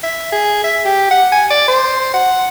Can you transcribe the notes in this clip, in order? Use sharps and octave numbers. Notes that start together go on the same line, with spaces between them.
E5
G#4
E5
G4
F#5
G#5
D5
C5
F#5